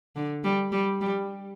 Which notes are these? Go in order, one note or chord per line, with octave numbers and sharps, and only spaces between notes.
D3
G3
G3
G3